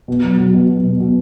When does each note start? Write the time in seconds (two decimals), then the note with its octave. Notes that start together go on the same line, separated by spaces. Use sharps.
0.08 B2
0.23 F#3
0.38 F#3
0.54 B2
0.69 F#3
0.84 B2
1.00 B2